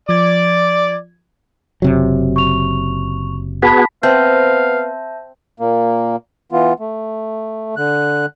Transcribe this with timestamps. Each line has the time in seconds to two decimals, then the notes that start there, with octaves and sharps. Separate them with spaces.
0.09 F3 D5 D6 G#6
1.82 F#1 C3 F#3
2.36 C#6 F7
3.62 B3 F#4 G#4 A5 B5 B6
4.03 B3 C4 E5 F5 A5 G6
5.60 A#2 A#3
6.52 E3 B3 F4
6.80 A3
7.77 D3 F#6